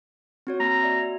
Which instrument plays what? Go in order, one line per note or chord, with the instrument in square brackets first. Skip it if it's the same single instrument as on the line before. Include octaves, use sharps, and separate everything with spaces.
[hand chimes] C4 F#4 C#5
[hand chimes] A#3 [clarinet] A#5
[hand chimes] F#4 D5 E5